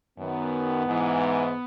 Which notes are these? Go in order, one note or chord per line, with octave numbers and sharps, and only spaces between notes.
F#2 D#3 B3
G#2 E3